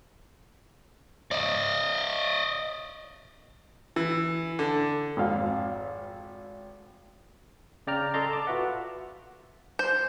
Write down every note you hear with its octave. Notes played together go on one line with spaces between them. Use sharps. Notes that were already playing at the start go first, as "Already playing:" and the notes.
D5 D#5
E3
D3
G#1 F2 F5
C#3 D5 G5 A#5 F6
A4 D5 D#5 A#5 C6 A6
A5 D6
F4 F#4 B4 E5 F#5
C5